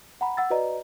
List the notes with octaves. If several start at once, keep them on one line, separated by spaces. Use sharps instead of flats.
F#5 A#5 B5
F#5 E6 A6
F#4 B4 D5 D#5 A#5